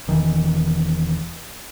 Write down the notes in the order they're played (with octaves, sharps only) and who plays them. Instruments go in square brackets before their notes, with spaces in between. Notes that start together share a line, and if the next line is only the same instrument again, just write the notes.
[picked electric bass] E1 D#3 E3